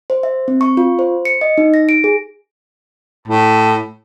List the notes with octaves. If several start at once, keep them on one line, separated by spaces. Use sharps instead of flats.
C5
E5
C4
C#6
F4
C5
C#7
D#5
D#4
A#6
D7
G#4
A2